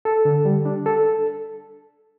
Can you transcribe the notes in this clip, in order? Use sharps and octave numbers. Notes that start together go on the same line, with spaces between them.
A4
D3
G3
D4
A4